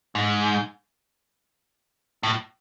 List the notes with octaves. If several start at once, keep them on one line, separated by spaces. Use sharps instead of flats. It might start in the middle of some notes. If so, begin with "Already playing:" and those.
G#2
A2